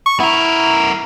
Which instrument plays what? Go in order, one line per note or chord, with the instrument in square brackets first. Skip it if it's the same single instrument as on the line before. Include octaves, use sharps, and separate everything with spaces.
[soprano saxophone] C#6
[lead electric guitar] B3 A#4 [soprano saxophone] E4